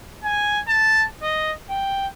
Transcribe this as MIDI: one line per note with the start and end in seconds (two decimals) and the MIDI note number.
0.24 0.60 80
0.68 1.04 81
1.23 1.52 75
1.70 2.07 79